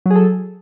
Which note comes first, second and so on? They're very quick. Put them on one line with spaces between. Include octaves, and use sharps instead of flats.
F#3 G#4 A4